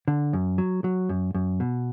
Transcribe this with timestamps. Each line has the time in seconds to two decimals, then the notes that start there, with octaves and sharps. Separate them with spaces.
0.08 D3
0.33 F#2
0.58 F#3
0.84 F#3
1.09 F#2
1.35 F#2
1.60 B2